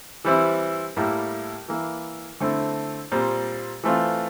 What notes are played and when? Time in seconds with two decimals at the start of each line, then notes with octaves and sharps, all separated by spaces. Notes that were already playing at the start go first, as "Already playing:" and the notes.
0.25 E3 G3 C4 E4
0.97 A2 G3 A#3 E4
1.68 E3 A#3 E4
2.40 D3 A3 C4 E4
3.12 A#2 G3 C4
3.84 E3 A3 C4 F4